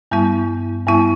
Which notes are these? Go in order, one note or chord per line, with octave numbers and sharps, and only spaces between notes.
G2 G3 B3 E4
G2 G3 B3 E4